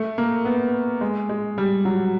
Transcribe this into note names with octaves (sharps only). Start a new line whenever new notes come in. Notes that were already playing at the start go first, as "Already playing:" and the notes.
Already playing: A3
A#3
B3
G#3
G#3
G3
F#3